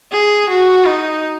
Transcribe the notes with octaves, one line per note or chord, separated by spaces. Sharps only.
G#4
F#4
D#4